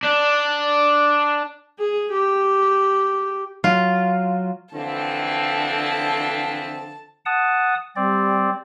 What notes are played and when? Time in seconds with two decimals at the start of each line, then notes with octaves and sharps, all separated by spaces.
0.03 D4
1.79 G#4
2.12 G4
3.64 F#3 F4
4.74 D3 E3 F3 C4 A5
7.26 F#5 A5 D#6
7.96 G3 C4 D5